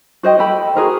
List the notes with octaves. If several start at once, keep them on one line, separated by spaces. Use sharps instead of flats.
F#4 C5 D#5 G5
G4 A4 G5 B5
F#4 G#4 A#4 C5